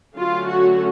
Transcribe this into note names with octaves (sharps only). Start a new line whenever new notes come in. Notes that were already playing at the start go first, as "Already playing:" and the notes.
D3 F#3 A3 C#4 F4
F#4